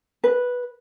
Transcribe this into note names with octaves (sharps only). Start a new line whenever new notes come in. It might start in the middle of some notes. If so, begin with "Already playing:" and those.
B4